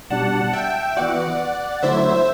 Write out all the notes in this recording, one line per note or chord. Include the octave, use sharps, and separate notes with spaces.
B2 G3 D4 F#5 A5
E5 G5
E3 B3 F#4 D5 F#5
D3 F#3 A3 E4 C5 E5